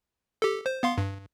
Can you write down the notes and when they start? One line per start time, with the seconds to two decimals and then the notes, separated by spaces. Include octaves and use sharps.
0.42 G4 A4
0.66 C5
0.83 B3 F5 C6
0.98 G2